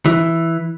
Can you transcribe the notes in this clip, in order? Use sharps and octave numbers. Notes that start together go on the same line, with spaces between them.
E3